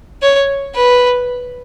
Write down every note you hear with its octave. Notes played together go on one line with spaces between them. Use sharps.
C#5
B4